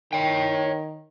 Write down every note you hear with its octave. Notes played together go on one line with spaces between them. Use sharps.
D#3 C#5 G5